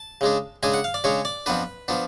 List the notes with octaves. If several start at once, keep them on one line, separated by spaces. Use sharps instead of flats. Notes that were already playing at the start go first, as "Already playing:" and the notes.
Already playing: A5
C#3 G#3 D4
C#3 G#3 D4 G#5
F#5
F5
D5
C#3 G#3 D4 C#5
D5
F2 F3 B3 D4 B4
F3 B3 D4